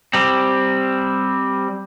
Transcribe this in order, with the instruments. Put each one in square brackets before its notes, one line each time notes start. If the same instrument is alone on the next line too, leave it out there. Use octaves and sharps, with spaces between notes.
[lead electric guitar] G3 C4